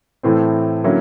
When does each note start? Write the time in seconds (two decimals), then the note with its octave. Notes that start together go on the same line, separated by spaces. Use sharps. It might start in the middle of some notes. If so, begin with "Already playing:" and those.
0.23 A2 E3 A3 C4
0.84 D3 F#3 A#3 C#4 E4